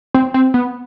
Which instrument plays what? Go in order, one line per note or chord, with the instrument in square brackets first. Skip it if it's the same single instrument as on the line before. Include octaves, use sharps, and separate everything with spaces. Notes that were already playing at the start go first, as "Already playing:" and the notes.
[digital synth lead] C4
C4
B3